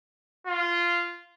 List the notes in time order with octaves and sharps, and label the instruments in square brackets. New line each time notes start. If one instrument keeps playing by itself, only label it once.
[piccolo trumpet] F4